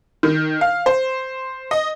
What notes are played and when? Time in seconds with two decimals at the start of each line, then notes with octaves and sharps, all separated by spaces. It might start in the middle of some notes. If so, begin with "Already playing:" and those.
0.23 D#3
0.61 F5
0.86 C5
1.71 D#5